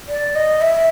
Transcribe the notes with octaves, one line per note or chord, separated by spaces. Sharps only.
D5
D#5
E5